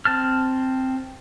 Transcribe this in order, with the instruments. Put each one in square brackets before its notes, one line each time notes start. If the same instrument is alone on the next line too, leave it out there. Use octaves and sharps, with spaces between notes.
[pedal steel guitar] C4 A5 F6